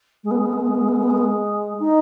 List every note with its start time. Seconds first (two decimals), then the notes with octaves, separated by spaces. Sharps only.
0.24 G#3
0.31 B3
0.39 G#3
0.46 B3
0.53 G#3
0.60 B3
0.67 G#3
0.75 B3
0.81 G#3
0.89 B3
0.96 G#3
1.03 B3
1.10 G#3
1.17 B3
1.24 G#3
1.80 D#4